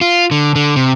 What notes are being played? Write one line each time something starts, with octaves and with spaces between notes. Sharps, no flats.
F4
D3
D3
C3